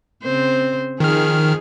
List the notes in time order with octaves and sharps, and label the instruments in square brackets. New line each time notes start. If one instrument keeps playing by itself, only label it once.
[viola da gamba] C#3 C4 C5
[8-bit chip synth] D#3 F6 [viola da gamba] F3 D#4 G#4